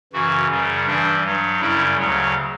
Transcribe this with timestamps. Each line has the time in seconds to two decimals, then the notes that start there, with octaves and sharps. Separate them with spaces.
0.13 F#2 C#3 E3 F#4
0.50 F#2 C#3 G3
0.87 G2 E3 G3 D4
1.24 G2 F#3
1.60 F#2 C#3 G3 E4
1.98 D2 C#3 F#3